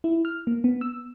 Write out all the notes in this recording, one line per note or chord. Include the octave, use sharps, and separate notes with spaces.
E4
F6
A#3
B3
E6